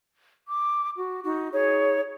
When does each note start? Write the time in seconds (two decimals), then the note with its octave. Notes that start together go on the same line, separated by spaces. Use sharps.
0.47 D6
0.97 F#4
1.24 D#4 F#4
1.53 D#4 G#4 C#5